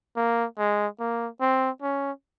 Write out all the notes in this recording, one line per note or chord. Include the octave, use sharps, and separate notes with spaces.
A#3
G#3
A#3
C4
C#4